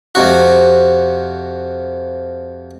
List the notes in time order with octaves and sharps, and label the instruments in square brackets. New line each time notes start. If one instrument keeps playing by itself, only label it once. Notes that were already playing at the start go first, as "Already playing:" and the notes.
[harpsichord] F2 C3 F#4